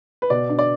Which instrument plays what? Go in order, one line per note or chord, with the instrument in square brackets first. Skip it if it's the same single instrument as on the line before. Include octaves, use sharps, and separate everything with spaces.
[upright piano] B4
B2 D5
D4
D5